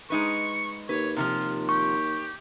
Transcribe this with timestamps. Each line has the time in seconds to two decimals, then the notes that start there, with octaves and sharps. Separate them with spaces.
0.10 G#3 D#4 B4 C#6
0.89 D#2 B4 C#5
1.16 C3 E3 F3 F4
1.69 G4 C#6